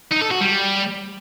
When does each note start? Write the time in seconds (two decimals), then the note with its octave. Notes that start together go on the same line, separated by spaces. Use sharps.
0.11 D#4
0.21 A4
0.31 F#4
0.41 G3